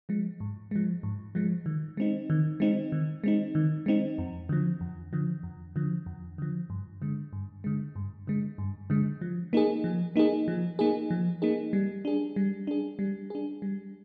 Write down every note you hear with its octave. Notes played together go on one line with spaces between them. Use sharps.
F3 G#3
G#2
F3 G#3
G#2
F3 G#3
D#3
G#3 C4 D#4
D#3
G#3 C4 D#4
D#3
G#3 C4 D#4
D#3
G#3 C4 D#4
F2
D3 F3
F2
D3 F3
F2
D3 F3
F2
D3 F3
G2
D3 G#3
G2
D3 G#3
G2
D3 G#3
G2
D3 G#3
F3
A#3 D#4 G#4
F3
A#3 D#4 G#4
F3
A#3 D#4 G#4
F3
A#3 D#4 G#4
G3
D4 G#4
G3
D4 G#4
G3
D4 G#4
G3